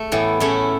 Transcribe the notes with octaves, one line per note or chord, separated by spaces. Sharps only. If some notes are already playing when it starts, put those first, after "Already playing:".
Already playing: A3
A2 E3 B3
A2 A3 C#4 E4